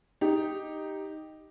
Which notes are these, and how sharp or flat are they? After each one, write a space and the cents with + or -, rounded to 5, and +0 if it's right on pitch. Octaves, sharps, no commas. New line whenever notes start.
D#4 +0 G4 +0